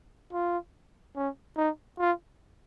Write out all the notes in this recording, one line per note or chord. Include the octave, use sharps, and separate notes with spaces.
F4
C#4
D#4
F4